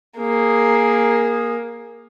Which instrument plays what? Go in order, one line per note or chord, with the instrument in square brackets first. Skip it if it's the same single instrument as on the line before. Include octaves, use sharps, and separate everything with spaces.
[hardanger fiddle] A#3 [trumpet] G#4